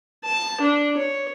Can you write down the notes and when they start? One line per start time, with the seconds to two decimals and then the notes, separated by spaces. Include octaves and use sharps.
0.24 A5
0.61 D4
0.98 C#5